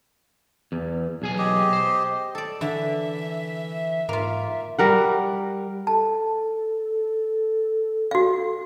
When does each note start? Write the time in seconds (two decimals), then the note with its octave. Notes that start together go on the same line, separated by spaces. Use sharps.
0.72 E2
1.22 B1 G#4 G#5
1.38 G4 D#5
1.73 C5
2.35 A4 D5
2.61 D3 E3 E5
4.09 G#2 A#3 F4
4.79 G3 A#4 F#5
5.87 A4 A5
8.11 F#4 F5